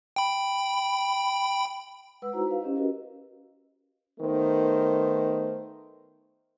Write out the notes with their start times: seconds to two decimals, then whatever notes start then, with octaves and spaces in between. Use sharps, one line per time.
0.16 G5 B5
2.22 G#3 B4 F#5 E6
2.33 D#4 E4 F#4 C5 A#5
2.47 B4 F5
2.61 C#4 G4 C5 D#5
2.76 F#4 A#4 B4 D#5
4.20 D#3 A3 B3 D#4 A#4 C5